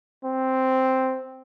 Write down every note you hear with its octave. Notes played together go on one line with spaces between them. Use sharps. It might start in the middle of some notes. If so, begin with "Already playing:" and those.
C4